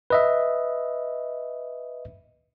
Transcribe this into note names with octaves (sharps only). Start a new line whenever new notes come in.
B4 D#5 E5